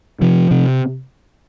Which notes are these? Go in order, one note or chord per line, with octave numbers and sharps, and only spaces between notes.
C3 F3
C3